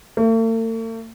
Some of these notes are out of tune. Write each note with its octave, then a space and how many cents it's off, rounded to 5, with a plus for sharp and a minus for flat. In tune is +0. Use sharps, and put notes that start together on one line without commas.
A3 +45